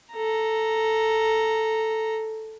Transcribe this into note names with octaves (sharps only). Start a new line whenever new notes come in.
A4 A#5